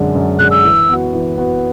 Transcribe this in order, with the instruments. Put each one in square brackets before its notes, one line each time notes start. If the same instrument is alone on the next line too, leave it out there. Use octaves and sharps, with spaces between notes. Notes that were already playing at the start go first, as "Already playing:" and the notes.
Already playing: [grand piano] F#2 D3 G#3 D4
F#2
[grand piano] D3 G#3 D4 [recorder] F#6
[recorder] E6
[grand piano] E3
B3 F#4
E3
B3 F#4